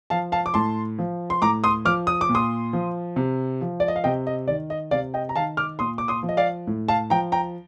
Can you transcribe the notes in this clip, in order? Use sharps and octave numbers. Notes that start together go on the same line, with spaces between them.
F3 F5 A5
F5 A5
D6
A2 A5 C6
F3
C6
A2 A#5 D6
C6 D#6
F3 D6 F6
D#6
D6
A#2
C6 D#6
F3
C3
F3
D5
D#5
F5
C3 D#5 G5
D#5
D#3 D5
D#5
C3 D5 F5
D#5 G5
A#5
D#3 F5 A5
D6 F6
A#2 C6 D#6
D6
C6 D#6
F3
D#5
D5 F5
A2
F5 A5
F3 G5 A#5
G5 A#5